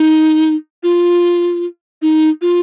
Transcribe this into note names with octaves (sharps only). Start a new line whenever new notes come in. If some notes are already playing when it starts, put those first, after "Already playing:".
Already playing: D#4
F4
D#4
F4